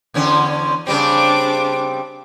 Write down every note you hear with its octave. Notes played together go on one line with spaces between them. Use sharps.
E2 D3 C#4
C#3 G3 C4 D4 D6